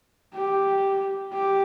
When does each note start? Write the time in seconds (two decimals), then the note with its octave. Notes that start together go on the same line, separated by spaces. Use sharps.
0.35 G4
1.33 G4